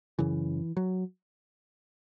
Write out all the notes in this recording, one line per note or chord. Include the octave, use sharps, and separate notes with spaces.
F#2 C#3 E3
F#3